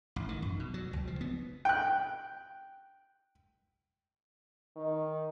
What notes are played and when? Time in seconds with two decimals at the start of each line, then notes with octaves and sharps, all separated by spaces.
0.16 A1
0.29 D#3
0.42 F#2
0.60 B2
0.74 F#3
0.93 C#2
1.07 F3
1.21 B3
1.65 G5 F#6
4.76 D#3